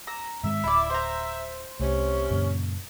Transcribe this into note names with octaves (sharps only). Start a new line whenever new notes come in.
A#5 E6
G#2 D#3 G#3 E5
D1 E4 D5
C5 A#5
C2 C3 A3 C#4
F#2 A#2 C#3